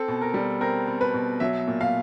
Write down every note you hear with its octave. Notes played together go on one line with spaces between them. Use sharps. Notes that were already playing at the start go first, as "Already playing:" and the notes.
Already playing: C4 A4
B2
A#4
G3
C4 A#4
C4
B4
B2
F#3 E5
A#2
F5